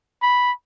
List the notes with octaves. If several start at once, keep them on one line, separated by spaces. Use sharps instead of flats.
B5